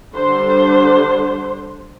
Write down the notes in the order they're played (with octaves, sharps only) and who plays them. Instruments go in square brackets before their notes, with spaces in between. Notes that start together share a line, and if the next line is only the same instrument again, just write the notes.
[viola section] D3 G3 D4 C5